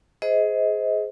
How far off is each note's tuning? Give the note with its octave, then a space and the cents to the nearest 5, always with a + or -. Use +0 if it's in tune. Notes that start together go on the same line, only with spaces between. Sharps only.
G#4 +15 C5 -15 D#5 +25